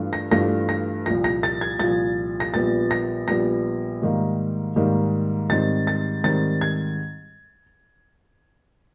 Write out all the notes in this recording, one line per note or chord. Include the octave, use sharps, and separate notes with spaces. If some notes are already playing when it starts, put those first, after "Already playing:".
Already playing: G2 E3 A3 D4 F4
A#6
G2 E3 A3 D4 F4 A#6
A#6
C2 A#2 F3 A#6
A#6
A6
G#6
C2 A#2 F3 A6
A#6
A#1 A#2 G3 B3 A6
A#6
A#1 A#2 G3 B3 A#6
G#2 D#3 G3 A#3
G#2 D#3 G3 A#3
G#2 D#3 G3 C4 A6
A6
G#2 D#3 G3 C4 A6
G#6